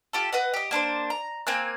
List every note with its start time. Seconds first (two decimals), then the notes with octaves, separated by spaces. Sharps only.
0.13 F4 G4 A4
0.33 B4 D#5 F#5
0.54 G4 D#5
0.71 A#3 D4 B4 C5
1.10 A#5
1.47 A#3 C4 G#5 F#6